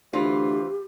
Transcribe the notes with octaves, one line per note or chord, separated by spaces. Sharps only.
D2 E3 F4 G4 C5